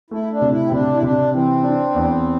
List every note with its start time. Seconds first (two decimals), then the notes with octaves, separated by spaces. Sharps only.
0.10 A3 E4
0.31 D4
0.41 C3
0.51 E4
0.66 C4
0.72 C3 D4
0.94 E4
1.02 C3 D4
1.33 E3 C4
1.63 D4
1.95 E2